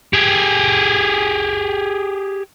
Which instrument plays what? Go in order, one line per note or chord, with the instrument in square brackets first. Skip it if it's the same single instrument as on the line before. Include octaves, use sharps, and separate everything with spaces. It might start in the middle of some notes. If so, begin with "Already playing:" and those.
[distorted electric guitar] G4 G#4